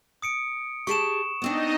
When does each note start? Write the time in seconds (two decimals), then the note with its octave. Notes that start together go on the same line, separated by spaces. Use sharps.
0.22 D#6 C#7 D7
0.87 G4 G#4 A5 C#6 E7
1.42 B3 C4 D4 D#4 D#5